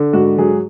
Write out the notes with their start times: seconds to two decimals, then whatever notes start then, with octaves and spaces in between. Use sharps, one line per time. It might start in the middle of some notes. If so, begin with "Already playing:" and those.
Already playing: D3
0.13 G#2 F#4
0.38 F#3 G#4